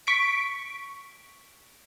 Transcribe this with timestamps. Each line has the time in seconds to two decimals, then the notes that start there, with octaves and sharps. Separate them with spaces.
0.07 C#6 B6 D7